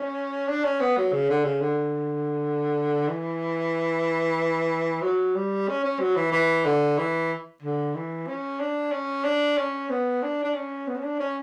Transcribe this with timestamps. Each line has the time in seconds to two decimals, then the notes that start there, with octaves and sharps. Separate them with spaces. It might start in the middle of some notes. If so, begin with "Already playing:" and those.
Already playing: C#4
0.48 D4
0.64 C#4
0.80 B3
0.97 F#3
1.12 C#3
1.29 D3
1.45 C#3
1.61 D3
3.08 E3
5.02 F#3
5.35 G3
5.68 C#4
5.84 C#4
6.00 F#3
6.16 E3
6.32 E3
6.65 D3
6.98 E3
7.62 D3
7.95 E3
8.27 C#4
8.60 D4
8.92 C#4
9.24 D4
9.58 C#4
9.90 B3
10.22 D4
10.43 D4
10.55 C#4
10.87 B3
10.96 C#4
11.03 D4
11.19 C#4